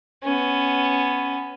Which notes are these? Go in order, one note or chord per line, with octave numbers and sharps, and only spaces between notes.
B3 C#4